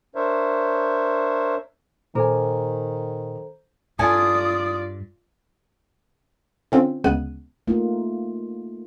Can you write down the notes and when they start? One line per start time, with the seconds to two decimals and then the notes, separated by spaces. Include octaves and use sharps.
0.15 D4 A#4 C5 C#5 E5
2.15 A#2 D#3 A4 C5 G#5 A#5
3.99 G2 F4 A4 D5 G#5 D#6
6.72 D3 C4 C#4 F4
7.04 D2 C#3 G#3 B3 F#6 D#7
7.67 A3 A#3 D#4 F4